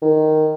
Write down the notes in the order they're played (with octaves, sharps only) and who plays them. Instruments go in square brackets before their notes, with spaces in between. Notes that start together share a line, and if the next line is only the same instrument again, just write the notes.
[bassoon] D#3